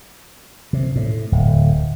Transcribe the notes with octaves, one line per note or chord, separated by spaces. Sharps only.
C3
A2
D1